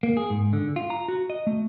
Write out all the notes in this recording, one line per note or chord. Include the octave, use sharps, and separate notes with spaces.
A#3
G#4
G#2
D3
F4
A#5
F#4
D#5
A3